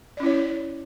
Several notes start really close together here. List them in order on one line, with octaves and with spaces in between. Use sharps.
D5 C#4 E4 C#5